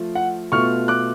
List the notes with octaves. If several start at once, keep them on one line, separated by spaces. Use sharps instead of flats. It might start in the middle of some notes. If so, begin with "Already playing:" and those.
Already playing: F3 A3 F4
F#5
B2 A3 F4 C#6 F6
D6 F#6